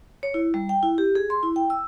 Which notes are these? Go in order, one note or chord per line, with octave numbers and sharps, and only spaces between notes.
C#5
E4
G3
G5
E4
G4
G#4
C6
E4
G5
E6